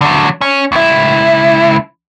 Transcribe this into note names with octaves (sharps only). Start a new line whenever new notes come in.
D3 F#3
C#4
C#2 E4